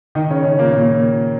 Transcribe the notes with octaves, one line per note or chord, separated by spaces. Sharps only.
D#3 D#4
C#3 C#4
C#3 C#4
A#2 A#3
A#2 A#3